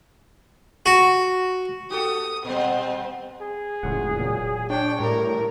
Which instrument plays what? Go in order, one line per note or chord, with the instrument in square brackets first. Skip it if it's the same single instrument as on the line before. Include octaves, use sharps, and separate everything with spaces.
[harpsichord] F#4
[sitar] F#4 G4 A4 [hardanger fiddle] D#6
[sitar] A#2 G3 [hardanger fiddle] C4
[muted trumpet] G#4
[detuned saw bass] E1 [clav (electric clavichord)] C#2 A2 F#5
[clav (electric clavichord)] A#2 F#3
[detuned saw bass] D4 [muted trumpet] C#5 [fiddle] G5
[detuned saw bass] A2 [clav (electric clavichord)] G3 D5 [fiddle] A#4